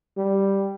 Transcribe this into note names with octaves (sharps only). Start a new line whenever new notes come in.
G3